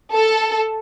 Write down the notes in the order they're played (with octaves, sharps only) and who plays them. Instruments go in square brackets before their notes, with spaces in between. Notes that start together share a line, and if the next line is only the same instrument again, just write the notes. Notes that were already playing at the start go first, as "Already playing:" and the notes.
[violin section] A4